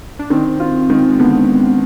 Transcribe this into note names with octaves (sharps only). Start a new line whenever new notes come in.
D4
D#3 C4
F4
D#3 G#3
G#3
D3 B3